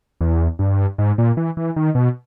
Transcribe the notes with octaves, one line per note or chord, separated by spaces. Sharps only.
E2
G2
G#2
A#2
E3
E3
D#3
B2